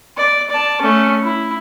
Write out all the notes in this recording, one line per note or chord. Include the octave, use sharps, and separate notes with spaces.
D5
D5 A5
A3 C#4
E4